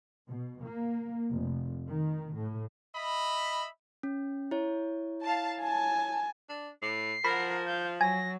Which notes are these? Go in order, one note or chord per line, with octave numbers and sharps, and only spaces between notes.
B2
A#3
F1
D#3
A2
D#5 E5 B5
C#4
E4 C#5
F5 A5
G#5 A5
D4
A2 C7
F3 A#4 F#5 B5
F5 G6
F#3 G#5 A#6